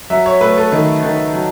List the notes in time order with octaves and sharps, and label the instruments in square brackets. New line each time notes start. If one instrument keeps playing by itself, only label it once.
[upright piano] F#3 E5
C#5
A3 B4
A4
D#3
D#3
F#3